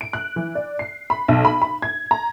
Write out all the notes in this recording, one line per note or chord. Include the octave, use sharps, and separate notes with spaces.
D7
F#6
E3
D5
C7
B5
B1
B5
B5
G#6
A#5